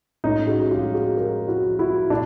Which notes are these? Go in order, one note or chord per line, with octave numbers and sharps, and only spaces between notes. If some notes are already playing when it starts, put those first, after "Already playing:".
A2 C#4 D#4
F#4 G#4
F3 F4 G4
F#4 G#4
F3 G#4 A#4
E4 F#4
F3
E4 F#4
A#2 D4